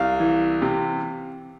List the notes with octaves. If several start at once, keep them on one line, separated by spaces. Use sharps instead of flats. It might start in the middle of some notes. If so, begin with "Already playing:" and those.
Already playing: C2 F5
E3
C3